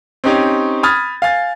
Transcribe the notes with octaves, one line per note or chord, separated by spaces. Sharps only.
C4 C#4 D#4 G4 C5 C#5
B5 D#6 F6 G#6 A6
F5 G#5 A6